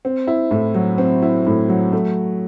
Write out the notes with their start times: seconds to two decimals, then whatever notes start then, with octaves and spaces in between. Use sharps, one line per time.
0.05 C4
0.27 E4
0.51 A2
0.74 F#3
0.98 C4
1.22 E4
1.46 A2
1.69 F#3
1.92 A3